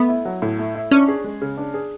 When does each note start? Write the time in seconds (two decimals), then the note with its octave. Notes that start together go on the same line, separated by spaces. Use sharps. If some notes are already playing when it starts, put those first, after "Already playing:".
Already playing: A3 B3
0.09 E4
0.25 F#3
0.42 A2
0.59 A3
0.75 E4
0.91 C#4 D4
1.08 G#4
1.24 G#3
1.42 C#3
1.57 D4
1.74 G#4